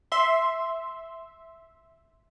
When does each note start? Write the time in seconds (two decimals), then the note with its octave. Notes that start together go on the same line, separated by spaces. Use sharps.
0.12 E5 C6